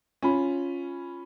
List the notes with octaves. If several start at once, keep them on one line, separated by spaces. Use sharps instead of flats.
C#4 F4 B5